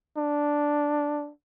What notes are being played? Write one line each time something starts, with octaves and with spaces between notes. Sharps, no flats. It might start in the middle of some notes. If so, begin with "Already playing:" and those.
D4